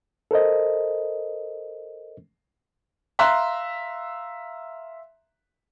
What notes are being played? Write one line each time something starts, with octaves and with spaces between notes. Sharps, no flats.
A4 A#4 C5 D#5
E5 F5 A#5 C6 F#6